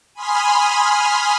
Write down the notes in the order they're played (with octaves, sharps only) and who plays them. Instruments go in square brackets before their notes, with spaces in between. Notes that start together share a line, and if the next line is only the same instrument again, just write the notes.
[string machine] G#5 B5 C6 D#6 F6